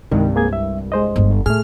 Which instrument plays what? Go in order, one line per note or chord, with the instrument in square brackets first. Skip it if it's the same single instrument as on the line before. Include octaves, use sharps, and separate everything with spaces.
[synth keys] C2 G2 [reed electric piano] D#3 [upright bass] G#3
[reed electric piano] A#3 G#4 G#6
E5
G#3 C5 D#5
[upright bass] G1 G2
[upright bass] A2 [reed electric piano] A3 G#4 [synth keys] F6